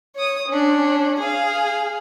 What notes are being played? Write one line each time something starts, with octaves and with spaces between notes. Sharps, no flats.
C#5 D#6
C#4 D4
G#4 F5